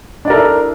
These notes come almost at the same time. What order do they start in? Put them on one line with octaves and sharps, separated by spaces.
D4 D5 A#4 A4 E4